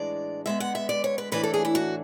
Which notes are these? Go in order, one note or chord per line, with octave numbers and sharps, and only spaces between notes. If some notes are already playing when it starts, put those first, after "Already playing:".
Already playing: A2 E3 G#3 D4 D5
D3 G#3 B3 E5
F#5
E5
D5
C#5
B4
A2 E3 A3 D4 B4
A4
G#4
E4
F#4